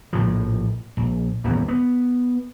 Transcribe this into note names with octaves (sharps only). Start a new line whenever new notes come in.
A#1 A2 F3
A#1
D#1 A1 F#2 B3
B3